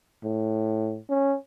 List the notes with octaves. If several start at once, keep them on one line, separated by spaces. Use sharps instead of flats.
A2
C#4